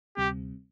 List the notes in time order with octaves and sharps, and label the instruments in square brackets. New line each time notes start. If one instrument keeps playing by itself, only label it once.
[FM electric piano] D2 C3 G3 C4 [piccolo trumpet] G4